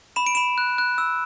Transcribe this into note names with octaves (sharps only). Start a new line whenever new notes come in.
B5 E7
D7
B5 E7
F#6
F#6
E6